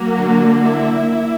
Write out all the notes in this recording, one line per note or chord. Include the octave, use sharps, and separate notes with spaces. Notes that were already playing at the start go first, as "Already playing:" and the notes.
Already playing: F#3 A#3
D3
E4
E4